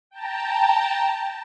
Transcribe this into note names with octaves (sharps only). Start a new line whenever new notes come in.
G5 A5 A#5